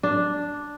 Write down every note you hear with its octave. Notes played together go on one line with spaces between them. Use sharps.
D4